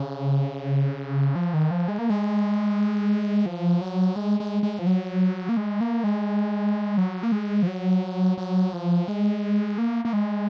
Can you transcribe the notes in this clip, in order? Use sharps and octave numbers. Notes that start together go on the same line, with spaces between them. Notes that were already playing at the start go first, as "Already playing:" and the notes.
Already playing: C#3
F3
D#3
F3
G#3
A#3
G#3
F3
F#3
G#3
G#3
G#3
F3
F#3
A#3
G#3
A#3
G#3
F#3
A#3
G#3
F3
F#3
F#3
F3
G#3
A#3
A#3
G#3